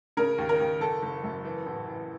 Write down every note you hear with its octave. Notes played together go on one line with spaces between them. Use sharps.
C#3 A#4
D#2
A#4
D#2
F#1 A4
F#1
F#2
E3
A1
E3